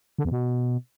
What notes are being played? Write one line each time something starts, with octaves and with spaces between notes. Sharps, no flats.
D3
E2
B2